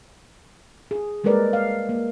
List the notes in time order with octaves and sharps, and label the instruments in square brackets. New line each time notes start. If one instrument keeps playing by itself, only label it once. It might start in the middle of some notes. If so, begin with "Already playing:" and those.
[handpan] G#4
G3 G#3 A#3 A#4 B4 D5
F5
A#3